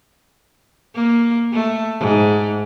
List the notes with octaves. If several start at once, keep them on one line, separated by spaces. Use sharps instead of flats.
A#3
A3
G#2